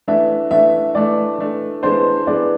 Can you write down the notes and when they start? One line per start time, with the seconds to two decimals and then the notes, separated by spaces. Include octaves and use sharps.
0.08 E3 A3 D4 E5
0.51 E3 A3 D4 E5
0.95 E3 A3 D4 D5
1.38 E3 A3 D4
1.83 E3 G#3 B3 D4 C5
2.27 E3 G#3 B3 D4 D5